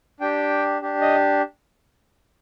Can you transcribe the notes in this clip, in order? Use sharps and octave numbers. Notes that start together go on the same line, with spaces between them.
D4 G4 G5
D4 G4
D#5